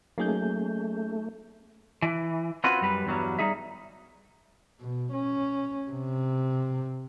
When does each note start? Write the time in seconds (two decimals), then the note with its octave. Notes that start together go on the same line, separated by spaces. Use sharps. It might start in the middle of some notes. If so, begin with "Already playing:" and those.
0.18 F#3 A3 A#3 C#4 D#4 G#4 G6
2.02 E3
2.64 C4 C#4 F4 F#4 B4
2.81 F#2 G3 B4
3.06 E2 G2 F#3 G3
3.39 G3 D#4 G#4 E5
4.80 B2
5.13 C#4
5.91 C3